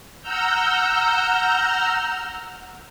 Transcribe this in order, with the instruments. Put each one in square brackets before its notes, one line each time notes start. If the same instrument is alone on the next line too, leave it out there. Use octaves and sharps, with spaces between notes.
[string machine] F#5 A#5 E6 F6 G6